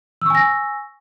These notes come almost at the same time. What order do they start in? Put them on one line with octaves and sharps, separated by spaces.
E6 C#6 G#5 A#6